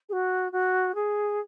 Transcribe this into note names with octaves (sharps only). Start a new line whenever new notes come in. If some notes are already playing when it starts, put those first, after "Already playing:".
G#4
F#4
F#4
G#4